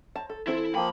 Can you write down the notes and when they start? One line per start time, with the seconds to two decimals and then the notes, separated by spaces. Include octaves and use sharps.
0.16 C5 C#5 A5 A#5
0.30 A4
0.47 E3 C4 E4 F4 A4
0.75 F3 A#3 A#4 G5 G#5 B5